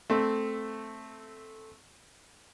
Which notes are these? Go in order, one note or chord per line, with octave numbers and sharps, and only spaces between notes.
A3 C4